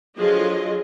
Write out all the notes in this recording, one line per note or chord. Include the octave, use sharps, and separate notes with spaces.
D3 F3 F#3 F4 G#4 D#5